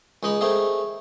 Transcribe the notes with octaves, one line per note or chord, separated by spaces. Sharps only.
C#2 G#3 D#4 D#5 B5
A3 C4 D#4 G#4 A#4